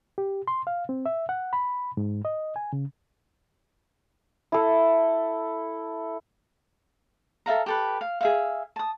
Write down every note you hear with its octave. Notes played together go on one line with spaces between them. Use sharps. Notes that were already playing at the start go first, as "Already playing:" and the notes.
G4
C6
F5
C4
E5
F#5
B5
G#2
D#5
G#5
C#3
E4 A4
A4 E5 F5 A#5
G4 A4 B4
F5
G#4 E5 F5
A5 D#6